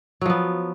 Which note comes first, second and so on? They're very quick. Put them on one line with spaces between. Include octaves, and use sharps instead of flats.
F#3 F3 B3